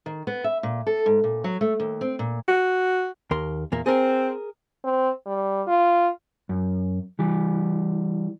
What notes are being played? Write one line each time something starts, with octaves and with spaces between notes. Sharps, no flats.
D#3
B3
E5
A#2
A4
G#2
A#2
F#3
A3
D#2
C4
A#2
F#4
D#2 A#4 C6
E2 A#2 A#3
C4 G#4 A#4
C4
G3
F4
F#2
E3 G3